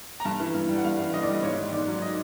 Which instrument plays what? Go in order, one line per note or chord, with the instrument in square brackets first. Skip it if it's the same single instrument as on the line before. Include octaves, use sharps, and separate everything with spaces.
[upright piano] A#5
G2 A5
E3
G2
G3
F#5
G2 F5
E3
G2 D#5
D5
G3 D#5
G#2 C#5
D#3
G#2 D5
F#3
D#5